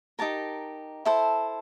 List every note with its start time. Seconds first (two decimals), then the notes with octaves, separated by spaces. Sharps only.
0.19 D#4 G4 A#4 A5
1.05 E4 A4 C5